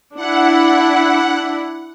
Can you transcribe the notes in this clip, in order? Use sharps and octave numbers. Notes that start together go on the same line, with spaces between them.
D4 E4 F#5